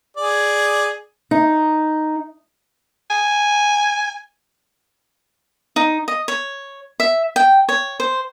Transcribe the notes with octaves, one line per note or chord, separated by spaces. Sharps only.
G#4 D5
D#4
G#5
D#4
D#5
C#5
E5
G5
C#5
C5